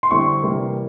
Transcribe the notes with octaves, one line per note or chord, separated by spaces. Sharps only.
C6
D3 G3 C4 E4 C#6
C3 E3 G3 A#3